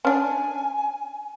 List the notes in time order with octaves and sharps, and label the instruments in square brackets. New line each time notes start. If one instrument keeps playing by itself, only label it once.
[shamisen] C#4 D4 [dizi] G#5